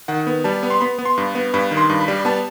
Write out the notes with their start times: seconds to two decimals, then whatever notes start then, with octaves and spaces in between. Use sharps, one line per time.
0.08 D#3 F#5
0.27 B3
0.44 G3 A5
0.63 B3
0.70 C6
0.81 B3 B5
0.99 B3
1.05 C6
1.18 G2
1.35 B3
1.54 G2 B5
1.71 D#3
1.77 C6
1.90 G2
2.01 B5
2.08 G3
2.25 B3 A5